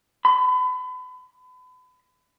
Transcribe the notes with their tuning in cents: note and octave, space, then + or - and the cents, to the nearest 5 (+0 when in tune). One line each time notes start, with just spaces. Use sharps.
B5 +35